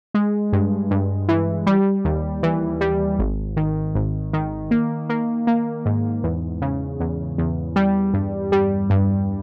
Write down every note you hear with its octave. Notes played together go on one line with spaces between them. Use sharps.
G#3
G2
G2
E3
G3
D#2
E3
G3
G#1
D#3
G#1
D#3
A#3
A#3
A#3
G#2
E2
C#3
E2
E2
G3
G2
G3
G2